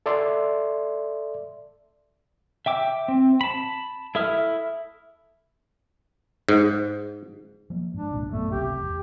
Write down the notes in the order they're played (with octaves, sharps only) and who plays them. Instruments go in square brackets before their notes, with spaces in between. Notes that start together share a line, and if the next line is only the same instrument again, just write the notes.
[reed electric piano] A4 D5 E5 C6
[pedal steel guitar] E5 G5 D6 E6
C4
A5 B5
E4 A4 E5 D#6 F6
[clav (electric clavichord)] G#2
[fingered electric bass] F3 A#3
[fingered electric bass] G#2 [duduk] D4
[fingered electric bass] G#1 C#2 A#2
[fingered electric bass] A1 F#2 B3 [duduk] A3
[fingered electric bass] G#1 C#2 C3 [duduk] G4
[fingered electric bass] E2